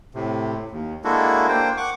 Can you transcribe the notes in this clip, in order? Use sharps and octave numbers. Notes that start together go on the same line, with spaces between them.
A2 C3
D#2
G#3 A#3 D4 E4 F#4 A4
A#3 D4 C5 G5
F#5 C#6 D6